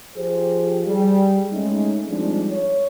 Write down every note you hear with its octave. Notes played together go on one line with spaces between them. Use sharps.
F3 G4 G#4 C5
G3 G4 G#4
G#3 A3 C#4 D#4
F3 G3 G#3 C4 D4 D#4
C#5